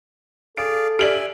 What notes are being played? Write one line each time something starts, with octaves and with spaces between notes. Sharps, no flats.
G#4 A4 D5 F5 D7
G4 D5 E5 G#5 D7 F#7